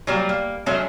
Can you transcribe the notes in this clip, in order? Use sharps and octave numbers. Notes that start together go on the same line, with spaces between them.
F#3 G3 A#3
A#3
F#3 G#3 A3 C#4